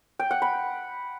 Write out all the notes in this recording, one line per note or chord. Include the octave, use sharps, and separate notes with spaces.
G5
F#5
B5